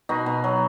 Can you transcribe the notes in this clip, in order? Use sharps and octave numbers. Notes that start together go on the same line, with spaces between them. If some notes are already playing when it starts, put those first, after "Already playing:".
B2 D#4 F#4
B2
F#3